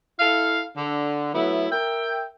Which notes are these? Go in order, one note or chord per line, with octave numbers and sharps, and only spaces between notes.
E4 A4 F5
D3
F#3 A3 B3 E4
A#4 E5 G5